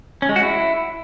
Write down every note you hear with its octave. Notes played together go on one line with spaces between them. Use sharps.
C#4
G#3
F#4
E4